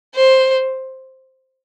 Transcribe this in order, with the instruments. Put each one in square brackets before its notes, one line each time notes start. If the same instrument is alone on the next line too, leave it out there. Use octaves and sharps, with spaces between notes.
[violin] C5